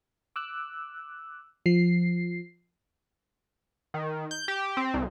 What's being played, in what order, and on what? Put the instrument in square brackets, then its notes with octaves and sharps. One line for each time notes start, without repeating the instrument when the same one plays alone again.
[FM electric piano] D6 E6 F#6
F3 C7
[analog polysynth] D#3
G6
G4
C4
C2